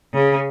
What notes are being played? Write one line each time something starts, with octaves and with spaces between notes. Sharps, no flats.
C#3